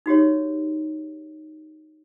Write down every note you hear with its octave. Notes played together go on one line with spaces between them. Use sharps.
D#4 F#4 G4 C#5